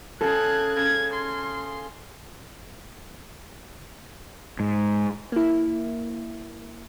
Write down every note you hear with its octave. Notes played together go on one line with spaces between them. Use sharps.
C#3 G#4 A4 F#6 G#6
C#3 G#6
C6
G#2
A#3 E4